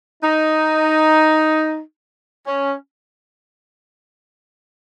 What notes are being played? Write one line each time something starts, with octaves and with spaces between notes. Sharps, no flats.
D#4
C#4